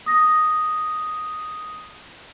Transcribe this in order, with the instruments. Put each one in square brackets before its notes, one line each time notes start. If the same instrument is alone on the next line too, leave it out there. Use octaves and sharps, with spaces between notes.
[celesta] D#6 A#6